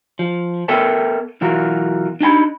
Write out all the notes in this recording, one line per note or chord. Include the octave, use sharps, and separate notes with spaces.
F3
B3 A4 A#4 E5 G5 A5
B1 E3 F4 F#4 A#4
D4 D#4 G#5 B5